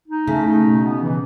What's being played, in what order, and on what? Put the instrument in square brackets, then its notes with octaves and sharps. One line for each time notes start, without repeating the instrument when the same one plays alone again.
[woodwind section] D#4
[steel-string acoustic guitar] C#3 [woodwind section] A3
[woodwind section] D#4
B2
B3
E3